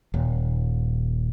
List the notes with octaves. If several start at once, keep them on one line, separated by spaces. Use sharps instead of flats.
D#1